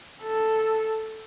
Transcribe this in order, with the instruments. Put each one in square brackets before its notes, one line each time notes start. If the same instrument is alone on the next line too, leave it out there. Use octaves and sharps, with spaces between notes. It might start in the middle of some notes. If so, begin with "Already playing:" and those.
[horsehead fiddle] A4